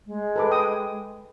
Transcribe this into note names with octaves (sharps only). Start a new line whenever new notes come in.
G#3
A4 B4 D6
G5 G#5 D#6